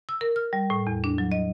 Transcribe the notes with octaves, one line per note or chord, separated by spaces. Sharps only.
E6
A#4
F6
G3
A2
E2
D4
F#3
D#5